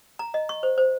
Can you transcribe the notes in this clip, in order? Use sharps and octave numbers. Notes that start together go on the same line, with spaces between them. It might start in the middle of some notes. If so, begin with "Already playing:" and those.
A#5
D#5
C#6
C5
C5